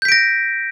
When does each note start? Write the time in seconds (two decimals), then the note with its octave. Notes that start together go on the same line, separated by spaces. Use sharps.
0.02 G6
0.05 B6
0.09 D7
0.12 A#6